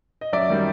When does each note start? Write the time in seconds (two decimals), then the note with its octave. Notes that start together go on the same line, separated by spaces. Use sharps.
0.21 D#5
0.33 F#2 D5 E5
0.50 D#3 G3